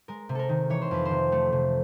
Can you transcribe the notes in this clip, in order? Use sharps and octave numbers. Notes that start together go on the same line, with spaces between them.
G#3 A#4
C3
A4 A#4
D#3
E3 C#5
C5
F2 B4
C5
C3
A3
C3